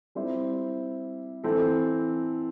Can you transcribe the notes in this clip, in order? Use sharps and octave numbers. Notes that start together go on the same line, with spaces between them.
G3 C4 E4 C5
E3 C4 A4